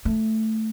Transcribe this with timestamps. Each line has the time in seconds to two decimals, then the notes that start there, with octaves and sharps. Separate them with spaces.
0.05 A3